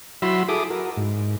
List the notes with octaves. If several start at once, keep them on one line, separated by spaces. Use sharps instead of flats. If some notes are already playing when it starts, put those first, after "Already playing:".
F#3 E4 F#4 B5 C6 E6
E4 G#4 A4 D6 D#6
F#4 A#4
G#2